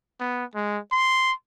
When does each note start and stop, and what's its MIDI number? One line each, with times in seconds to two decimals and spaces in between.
0.20 0.45 59
0.55 0.78 56
0.92 1.32 84